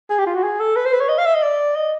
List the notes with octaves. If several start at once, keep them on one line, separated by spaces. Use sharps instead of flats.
G#4
G4
F4
F#4
G#4
A4
B4
C5
B4
C#5
D#5
F5
E5
D#5
D5
D#5